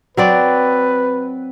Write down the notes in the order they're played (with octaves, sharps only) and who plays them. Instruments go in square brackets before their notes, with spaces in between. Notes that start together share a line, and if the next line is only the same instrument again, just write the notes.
[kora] F#3 C4 D5 [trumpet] B4